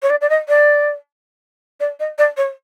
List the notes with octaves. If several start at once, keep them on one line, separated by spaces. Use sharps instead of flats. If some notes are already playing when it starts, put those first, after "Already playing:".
C#5
D5
D5
D#5
D5
D5
D#5
D5
C#5